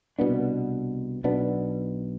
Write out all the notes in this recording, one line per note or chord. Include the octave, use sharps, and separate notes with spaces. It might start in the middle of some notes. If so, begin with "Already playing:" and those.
C2 B2 B3 D4
B1 B2 B3 D4